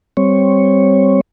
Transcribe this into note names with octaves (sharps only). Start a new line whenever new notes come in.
G3 C4 C#5